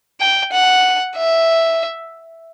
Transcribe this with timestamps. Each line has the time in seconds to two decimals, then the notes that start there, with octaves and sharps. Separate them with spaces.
0.21 G5
0.53 F#5
1.17 E5